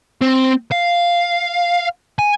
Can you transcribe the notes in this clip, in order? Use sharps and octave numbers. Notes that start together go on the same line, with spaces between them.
C4
F5
G#5